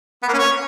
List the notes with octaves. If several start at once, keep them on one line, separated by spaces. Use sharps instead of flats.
B3
A#3
C#4
C#5